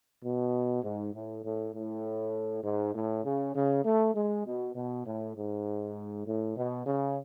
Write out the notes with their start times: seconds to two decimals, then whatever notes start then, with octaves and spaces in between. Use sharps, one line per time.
0.23 B2
0.83 G#2
1.14 A2
1.43 A2
1.74 A2
2.64 G#2
2.94 A2
3.24 C#3
3.55 C#3
3.85 A3
4.15 G#3
4.45 B2
4.75 B2
5.05 A2
5.36 G#2
6.26 A2
6.56 B2
6.86 C#3